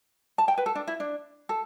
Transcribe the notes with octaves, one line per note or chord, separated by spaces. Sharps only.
A5
G5
B4
A4
D4
E4
D4
A4